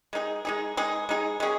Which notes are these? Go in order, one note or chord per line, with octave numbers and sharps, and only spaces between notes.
G#3 D#4 G#4
G#3 D#4 G#4
G#3 D#4 G#4
G#3 D#4 G#4
G#3 C#4 G#4